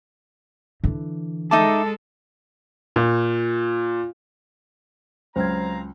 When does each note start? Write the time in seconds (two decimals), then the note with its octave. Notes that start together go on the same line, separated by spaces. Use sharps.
0.84 D3 E3
1.51 G#3 D#4 A4 E5 A5 D6
2.96 A#2
5.36 C#2 F#3 C4 C#4 C5 F5 A#5 G#6